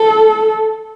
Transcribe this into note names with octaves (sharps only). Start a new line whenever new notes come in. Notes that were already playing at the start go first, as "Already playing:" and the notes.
Already playing: A4